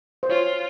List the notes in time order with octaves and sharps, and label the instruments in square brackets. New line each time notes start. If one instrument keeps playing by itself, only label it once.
[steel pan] C5
[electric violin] F4 [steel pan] C#5